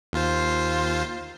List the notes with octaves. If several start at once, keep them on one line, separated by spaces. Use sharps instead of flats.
D#2 F4 C5